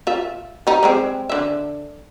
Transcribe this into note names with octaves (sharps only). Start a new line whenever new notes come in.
F4 E5
G3 D#4
G3 G#3 C4
D3 E5